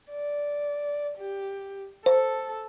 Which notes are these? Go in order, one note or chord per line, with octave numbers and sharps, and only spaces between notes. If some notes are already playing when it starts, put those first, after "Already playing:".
D5
G4
A4 C5